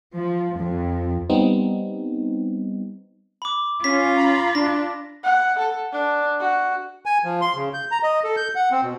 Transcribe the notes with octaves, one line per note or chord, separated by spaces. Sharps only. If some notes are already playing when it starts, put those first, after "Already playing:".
F3
F2
G3 B3 C4 D#4
B5 D6
C#4 F4 B6
A#5 B5
D4 A#6
F#5
A4
D4
F#4
G#5
F3
C6
C#3
G6
A#5
D#5
A4
G6
F#5
C4
B2